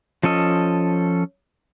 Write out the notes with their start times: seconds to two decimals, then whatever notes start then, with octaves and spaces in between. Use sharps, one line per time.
0.23 F3 C#4 A4 D#5